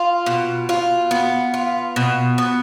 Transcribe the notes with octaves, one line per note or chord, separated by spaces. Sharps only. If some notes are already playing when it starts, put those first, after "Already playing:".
Already playing: F4
B2
F4
B3
F4
B2
B3